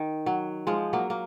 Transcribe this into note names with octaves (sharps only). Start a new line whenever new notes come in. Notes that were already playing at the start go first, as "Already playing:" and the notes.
Already playing: D#3
F#3
F3 G#3
F#3 A#3
A#3